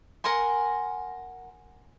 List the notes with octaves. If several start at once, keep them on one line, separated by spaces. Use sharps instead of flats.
A#4 F#5 G#5 C6